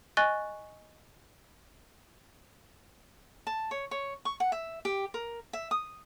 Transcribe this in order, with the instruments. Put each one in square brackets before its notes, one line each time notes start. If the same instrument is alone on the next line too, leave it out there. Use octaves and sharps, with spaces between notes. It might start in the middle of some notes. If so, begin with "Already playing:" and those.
[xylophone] D#5 G#5 C#6 F#6 A6 G7
[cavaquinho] A5
C#5
C#5
C#6
F#5
E5
G4
A#4
E5
D#6